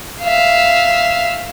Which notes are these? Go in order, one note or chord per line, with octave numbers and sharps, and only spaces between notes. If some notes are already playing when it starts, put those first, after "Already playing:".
E5 F5